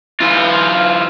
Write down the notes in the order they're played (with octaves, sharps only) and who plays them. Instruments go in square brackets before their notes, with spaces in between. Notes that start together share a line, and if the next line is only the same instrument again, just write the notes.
[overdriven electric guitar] E3 F4